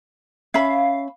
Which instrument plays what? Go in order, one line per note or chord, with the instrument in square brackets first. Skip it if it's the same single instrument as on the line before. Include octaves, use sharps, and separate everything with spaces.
[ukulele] C#4 E5 B5 [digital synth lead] F5